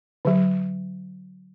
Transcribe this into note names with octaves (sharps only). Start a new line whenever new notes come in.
D3 F#3